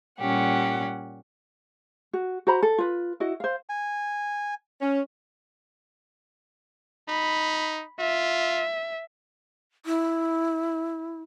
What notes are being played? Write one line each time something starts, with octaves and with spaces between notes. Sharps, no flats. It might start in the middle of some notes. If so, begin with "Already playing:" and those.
A#2 G3 C#4 G4 F#5
F#4
F#4 C5 A#5 B5
A4
F4 B4
E4 F#4 D#5
C5 F5
G#5
C#4
D#4 B5
F4 E5
E4